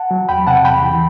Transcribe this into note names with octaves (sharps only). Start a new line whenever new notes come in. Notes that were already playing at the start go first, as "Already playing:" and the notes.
Already playing: F#5 A5
F#3
E2 G5 B5
C3 F#5 A5
E2 G5 B5
E3